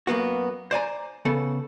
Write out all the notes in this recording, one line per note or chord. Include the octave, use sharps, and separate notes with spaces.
F#2 A#3 B3 F#4
C5 D5 G#5 A#5
C#3 B3 A4